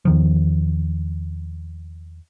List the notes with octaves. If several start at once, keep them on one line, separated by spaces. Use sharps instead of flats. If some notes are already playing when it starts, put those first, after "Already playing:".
E2 D#3 F3